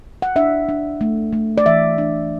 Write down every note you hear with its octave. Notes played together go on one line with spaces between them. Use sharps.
F#5
D4 E5
D4
A3
A3
D5
E3 E5
D4